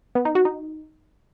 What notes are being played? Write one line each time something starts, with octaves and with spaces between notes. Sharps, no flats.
B3
D#4
F#4
D#4